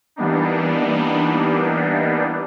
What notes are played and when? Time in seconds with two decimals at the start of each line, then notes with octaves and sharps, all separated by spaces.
0.16 E3 G3 A#3 B3 D4 D#4